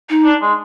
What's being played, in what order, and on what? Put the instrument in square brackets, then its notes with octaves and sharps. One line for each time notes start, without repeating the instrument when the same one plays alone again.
[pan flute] D#4
[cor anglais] D4
G#3